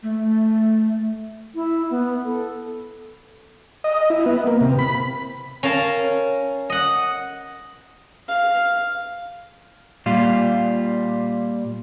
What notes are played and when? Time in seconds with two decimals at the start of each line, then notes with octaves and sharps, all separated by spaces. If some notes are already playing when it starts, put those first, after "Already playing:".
0.03 A3
1.55 E4
1.90 B3
2.25 A4
3.84 D#5
4.10 E4
4.26 B3
4.47 A#3
4.61 C3
4.79 B5
5.63 C#4 A#4 F5 A5
6.70 D#5 F#5
8.28 F5
10.06 A#2 G3 F4